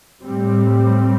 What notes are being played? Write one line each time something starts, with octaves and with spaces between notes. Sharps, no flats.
A2 G3 C4